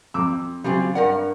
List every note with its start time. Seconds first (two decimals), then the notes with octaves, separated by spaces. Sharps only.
0.14 F2 D6 E6
0.64 C#3 F#3 G3 C4 F4 G#4
0.95 G2 A#4 D5 F#5